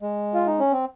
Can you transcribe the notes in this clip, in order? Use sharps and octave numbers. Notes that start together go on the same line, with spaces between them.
G#3
F4
D#4
C#4
C4